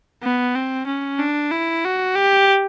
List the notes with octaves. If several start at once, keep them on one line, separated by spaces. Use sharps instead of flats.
B3
C4
C#4
D4
E4
F#4
G4